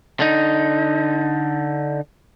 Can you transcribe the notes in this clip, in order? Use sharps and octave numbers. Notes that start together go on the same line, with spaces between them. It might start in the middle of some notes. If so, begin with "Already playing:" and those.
D3 D#4